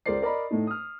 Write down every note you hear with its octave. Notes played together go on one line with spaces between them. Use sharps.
C#2 G#4 A#4 C5 D5 C7
A#4 D5 D#5 A#5 B5
A2 A3 D#4
D#6 F6